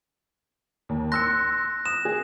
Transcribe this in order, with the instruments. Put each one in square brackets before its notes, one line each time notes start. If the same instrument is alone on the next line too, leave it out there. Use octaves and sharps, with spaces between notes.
[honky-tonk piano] D#2
[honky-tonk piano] C6 E6 C#7 [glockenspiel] F#6 A#6
[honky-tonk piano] D#6 [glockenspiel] E7
[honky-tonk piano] G#4